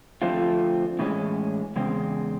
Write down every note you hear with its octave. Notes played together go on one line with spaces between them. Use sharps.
D3 F3 A3 C4 F4
A2 E3 G#3 C#4
E2 C#3 G#3 C4